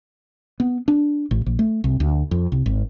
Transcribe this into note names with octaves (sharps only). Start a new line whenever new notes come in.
B3
D4
A1
A#1
A3
C2
D2
F2
C2
G#1